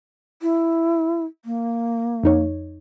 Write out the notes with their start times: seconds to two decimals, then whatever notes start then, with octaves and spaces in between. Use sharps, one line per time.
0.42 E4
1.45 A#3
2.24 F2 D#4 C#5